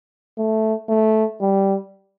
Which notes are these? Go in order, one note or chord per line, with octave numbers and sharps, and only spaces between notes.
A3
A3
G3